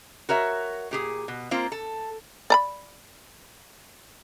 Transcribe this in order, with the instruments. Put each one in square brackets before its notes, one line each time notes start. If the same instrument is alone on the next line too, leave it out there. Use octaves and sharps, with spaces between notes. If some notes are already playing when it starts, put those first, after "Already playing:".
[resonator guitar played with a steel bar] F#4 A#4 C#5 E5
A#2 G4 G#4
B2
A#3 C4 F4
A4
[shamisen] D5 A#5 B5